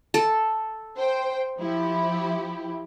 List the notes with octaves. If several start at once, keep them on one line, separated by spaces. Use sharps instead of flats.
A4
C5 G5
F3 E4 G4